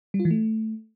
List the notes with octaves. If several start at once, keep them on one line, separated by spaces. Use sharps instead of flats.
G3
F4
E3
A3